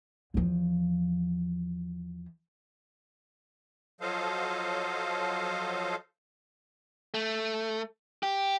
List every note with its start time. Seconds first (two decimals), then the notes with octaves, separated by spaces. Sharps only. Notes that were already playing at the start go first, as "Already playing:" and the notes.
0.34 E2 F3
4.01 F3 F#3 A4 C5 D#5 F5
7.14 A3
8.23 G4